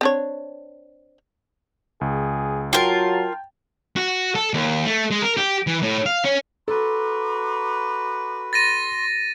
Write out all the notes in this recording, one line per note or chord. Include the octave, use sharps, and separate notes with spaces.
C4 D4 C#5
C#2 G#4
F#3 F4 A#4 G5 A5
F#4
A4
D#2
A3
G#3
A#4
G4
E3
A2
F5
C#4
F#4 A4 B4 A#5 C6 D6
C6 A6 A#6 D#7